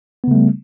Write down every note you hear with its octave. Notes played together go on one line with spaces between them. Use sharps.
C#3 G3 A3 B3